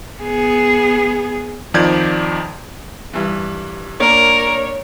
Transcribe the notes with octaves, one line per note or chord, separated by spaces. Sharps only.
B3 G#4
F2 D#3 F3 D5 G6 G#6
G2 E3
A#3 D4 A#4 C#5